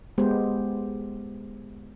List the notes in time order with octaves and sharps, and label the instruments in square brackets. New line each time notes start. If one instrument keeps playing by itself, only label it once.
[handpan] G#3 B3 G4 C5